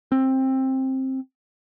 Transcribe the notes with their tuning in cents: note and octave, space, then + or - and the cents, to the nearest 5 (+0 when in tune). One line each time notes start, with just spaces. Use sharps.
C4 +15